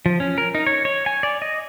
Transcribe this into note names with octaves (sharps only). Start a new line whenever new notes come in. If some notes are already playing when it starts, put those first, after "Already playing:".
F3
C#4
A#4
D#4
C#5
C#5
G#5
D5
D#5